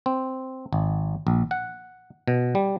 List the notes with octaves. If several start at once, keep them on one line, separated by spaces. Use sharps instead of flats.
C4
G#1
A#1
F#5
B2
G3